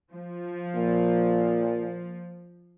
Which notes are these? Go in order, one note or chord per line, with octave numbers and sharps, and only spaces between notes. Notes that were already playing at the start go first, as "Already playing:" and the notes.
F3
A#2